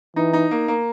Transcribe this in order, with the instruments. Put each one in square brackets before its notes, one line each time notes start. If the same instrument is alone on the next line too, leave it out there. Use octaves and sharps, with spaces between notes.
[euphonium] E3 [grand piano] D#4
[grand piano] D#4
A#3
A#3